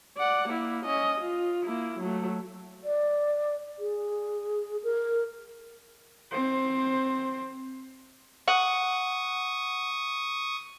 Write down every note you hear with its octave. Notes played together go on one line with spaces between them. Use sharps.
D5 F#5
A#3 E4
C#4 D#5
F4
A#3 E4
F#3 A3
D5
G#4
A#4
C4 C5
F#5 C#6 D#6